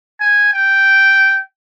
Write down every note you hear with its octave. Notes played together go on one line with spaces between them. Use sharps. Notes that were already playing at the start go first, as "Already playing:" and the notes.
G#5
G5